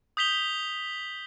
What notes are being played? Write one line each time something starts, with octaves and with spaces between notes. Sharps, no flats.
D#6 G6 B6 F7 G7